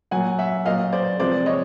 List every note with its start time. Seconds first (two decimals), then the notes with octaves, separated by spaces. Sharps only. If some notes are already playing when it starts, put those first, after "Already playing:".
0.11 A#2 F#3 F#5 G#5
0.39 E5 F#5
0.65 A#2 F#3 D#5 F5
0.93 C5 D5
1.20 C3 F3 G#3 C5 D5
1.46 C#5 D#5